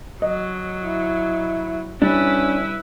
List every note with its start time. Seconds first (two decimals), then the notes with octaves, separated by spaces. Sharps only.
0.22 F#3 D#5
0.82 E4
2.02 G3 C#4 D4 E4 B4